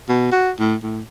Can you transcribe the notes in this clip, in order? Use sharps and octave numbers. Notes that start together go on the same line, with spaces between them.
B2
F#4
A2
A2